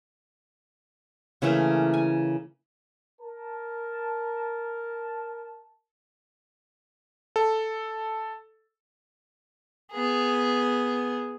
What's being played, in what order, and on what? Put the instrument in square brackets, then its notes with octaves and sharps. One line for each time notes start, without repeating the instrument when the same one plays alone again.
[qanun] C#3 E3 A3 A#3
G#5
[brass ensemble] A#4 A5
[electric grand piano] A4
[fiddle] B3 G#4